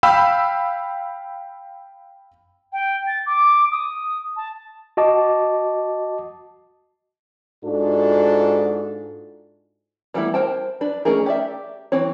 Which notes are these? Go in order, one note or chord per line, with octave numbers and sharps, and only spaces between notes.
F5 G5 B5 E6
G5
A6
D6
D#6
A5
F#4 D#5 A5 D6
G#2 D4 F4 F#4 A4
E3 G3 A3 B3 E4
A#4 C5 G5 A5
D4 B4
A3 C#4 D#4 G#4 A#4
G4 D5 E5
E3 C4 C#5